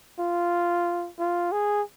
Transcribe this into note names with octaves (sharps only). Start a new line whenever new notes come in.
F4
F4
G#4